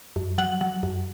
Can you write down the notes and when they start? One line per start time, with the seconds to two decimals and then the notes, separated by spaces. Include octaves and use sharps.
0.16 F#2
0.38 F#3 F#5
0.61 F#3
0.83 F#2